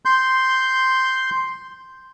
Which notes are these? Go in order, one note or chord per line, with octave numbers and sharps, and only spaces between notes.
C6 G6